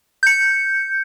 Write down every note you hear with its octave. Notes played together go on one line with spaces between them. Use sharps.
G6 C#7